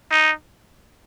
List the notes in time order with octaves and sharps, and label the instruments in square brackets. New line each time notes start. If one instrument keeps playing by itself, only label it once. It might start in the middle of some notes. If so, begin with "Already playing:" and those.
[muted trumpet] D#4